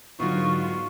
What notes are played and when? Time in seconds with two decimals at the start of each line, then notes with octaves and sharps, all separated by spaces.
0.20 G#2 D3 F#3 B3 D#4 F4 F#4 C#6